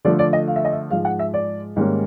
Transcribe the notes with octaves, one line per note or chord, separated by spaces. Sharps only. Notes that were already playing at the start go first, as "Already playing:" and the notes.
D3 F3 A3 D5
D5
D#5
F5
E5
D#5
E5
G#2 F3 G#3 F5
F#5
E5
D5
G#2 D#3 G3 A#3 C#4